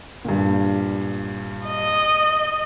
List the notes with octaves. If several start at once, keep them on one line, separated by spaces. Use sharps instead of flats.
G2 A#2
D#5